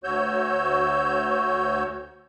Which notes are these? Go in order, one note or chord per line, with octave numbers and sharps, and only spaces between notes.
D2 F#4 C#5 E6 G6